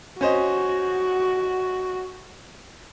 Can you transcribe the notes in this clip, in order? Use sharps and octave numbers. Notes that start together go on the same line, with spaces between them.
C#4 F#4 C5 D#5